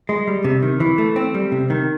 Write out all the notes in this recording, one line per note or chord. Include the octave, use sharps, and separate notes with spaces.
G#3
G3
C3
D#3
E3
A3
C4
G3
C3
D#3